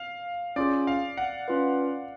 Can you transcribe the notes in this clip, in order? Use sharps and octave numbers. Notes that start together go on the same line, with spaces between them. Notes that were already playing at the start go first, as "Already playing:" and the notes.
Already playing: F5
C#4 F4 G#4 D5
F5
F#5
C#4 F4 B4